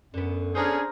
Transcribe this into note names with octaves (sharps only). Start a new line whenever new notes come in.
F#2 D3 B3
C#4 D4 G#4 C5 A#5 F6